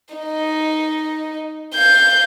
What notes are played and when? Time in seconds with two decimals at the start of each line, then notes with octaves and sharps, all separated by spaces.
0.15 D#4
1.75 F5 G6